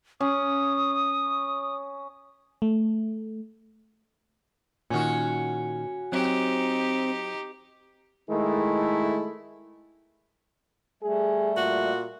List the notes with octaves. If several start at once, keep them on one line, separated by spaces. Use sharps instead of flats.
C#4 D#6
A3
A#2 D#3 C#4 F#4
F#3 C4 D#4 G4
D#3 G#3 A3 E4
G3 A3 G#4
A#2 F#4